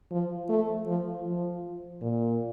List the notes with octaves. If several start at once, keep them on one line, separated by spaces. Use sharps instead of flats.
F3
A3
F3
F3
A#2